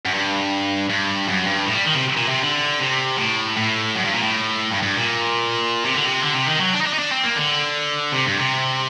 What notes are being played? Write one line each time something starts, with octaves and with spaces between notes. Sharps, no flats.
F#2
G2
G2
F#2
G2
A2
G3
D#3
C3
A#2
C3
D3
C3
A2
A2
F#2
G2
A#2
A2
G2
G2
A#2
C3
D3
C3
D3
C3
D#3
F#3
D4
D#4
D4
D#4
D4
C4
A#3
D3
C3
G2
C3